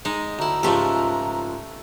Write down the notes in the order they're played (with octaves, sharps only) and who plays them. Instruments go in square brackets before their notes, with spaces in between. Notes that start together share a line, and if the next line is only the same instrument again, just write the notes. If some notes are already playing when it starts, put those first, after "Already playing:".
[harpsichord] G#3 [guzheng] D#4
[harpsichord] D2 E4 [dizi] A#5
[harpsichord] C#2 G#2 F3 [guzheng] A3 E5 [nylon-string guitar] G4